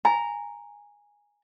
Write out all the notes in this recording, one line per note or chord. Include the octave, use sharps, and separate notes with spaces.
G#5 A#5